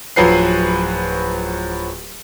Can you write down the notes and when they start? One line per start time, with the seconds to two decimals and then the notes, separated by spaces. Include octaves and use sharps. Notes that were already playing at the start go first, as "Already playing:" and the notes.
0.16 D1 F3 F#3 B4 C7